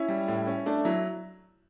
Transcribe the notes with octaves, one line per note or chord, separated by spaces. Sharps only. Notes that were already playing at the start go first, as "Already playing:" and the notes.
Already playing: C#4 E4
G3
A2
C#4
A3 D4
F#3 E4